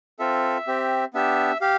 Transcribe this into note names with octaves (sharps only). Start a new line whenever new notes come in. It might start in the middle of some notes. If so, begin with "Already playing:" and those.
C4 F4 A4 E5
C4 G4
B3 D4 G4 E5
G4 F5